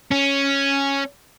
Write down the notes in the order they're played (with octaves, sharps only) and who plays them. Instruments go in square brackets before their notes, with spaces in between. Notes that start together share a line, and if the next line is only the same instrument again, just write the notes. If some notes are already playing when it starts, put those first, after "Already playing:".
[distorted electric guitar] C#4